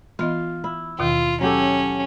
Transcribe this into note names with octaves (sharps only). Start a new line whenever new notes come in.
E3 B3 F4 D#5
E4
D#2 B2 D#3 F4
F#3 C#4 G4 A4